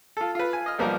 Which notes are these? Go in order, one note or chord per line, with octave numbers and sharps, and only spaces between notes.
F4 A4
F4 B4
G#5
D#5 F6
B1 F3 G3 A#3 B3 A#4